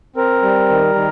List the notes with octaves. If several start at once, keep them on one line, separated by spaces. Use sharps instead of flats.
C4 A#4
G3
D#3
D#3